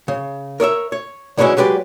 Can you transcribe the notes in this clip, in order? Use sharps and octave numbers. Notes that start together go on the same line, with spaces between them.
C#3
A#4 C#5 D#5 E5
C#5
D3 E3 F#3 G#3 C#4 E4
F#3 G#3 G4 B4 D5